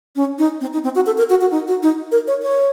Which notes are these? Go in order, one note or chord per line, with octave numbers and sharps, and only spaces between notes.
C#4
D#4
C4
D#4
C4
F#4
A4
A#4
F#4
F#4
D#4
F#4
D#4
A#4
C#5
C#5